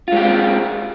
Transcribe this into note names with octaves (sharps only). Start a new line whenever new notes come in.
G#3 C4 F4 G4